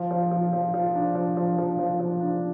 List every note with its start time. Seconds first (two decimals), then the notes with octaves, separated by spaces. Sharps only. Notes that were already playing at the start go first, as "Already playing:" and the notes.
Already playing: F3
0.11 F3
0.31 F3
0.53 F3
0.74 F3
0.95 D4
1.15 F3
1.37 F3
1.58 F3
1.79 F3
2.00 F3
2.21 D4